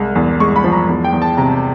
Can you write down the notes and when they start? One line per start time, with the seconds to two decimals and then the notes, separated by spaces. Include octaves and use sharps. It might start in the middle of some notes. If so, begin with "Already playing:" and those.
Already playing: C2 G#3
0.15 E2
0.40 G#3 C#6
0.56 B5
0.64 F3
0.72 A#5
0.88 E2
1.04 G5
1.12 E2
1.22 A5
1.37 C3 A#5